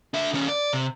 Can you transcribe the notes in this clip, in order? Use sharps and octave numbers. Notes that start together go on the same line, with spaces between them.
D4 E5
D#3 C#4
D5
C3